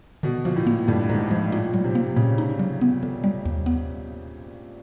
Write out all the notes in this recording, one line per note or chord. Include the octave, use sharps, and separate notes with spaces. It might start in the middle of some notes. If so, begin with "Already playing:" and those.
B2 D3
A#2 F3
A2
A#3
G2 D3
G#2 D3
A2 F3
A#2 D#4
F#3
C3
A#3
A#2 C#3
D#4
F#3
B3
D3
G3
D#2
B3